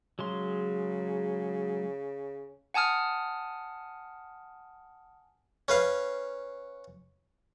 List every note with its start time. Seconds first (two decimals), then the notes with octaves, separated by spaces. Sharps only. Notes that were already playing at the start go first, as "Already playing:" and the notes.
0.19 C#3 F#3 G#3 C6
2.74 F#5 G#5 A5 D#6 F6
5.68 C#4 B4 F5